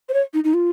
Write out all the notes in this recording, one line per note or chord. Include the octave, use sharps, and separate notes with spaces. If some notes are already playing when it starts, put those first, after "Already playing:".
C5
C#5
D#4
D#4
F4